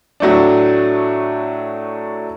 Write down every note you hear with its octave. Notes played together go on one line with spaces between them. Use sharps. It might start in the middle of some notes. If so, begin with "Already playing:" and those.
A2 F#3 A3 D4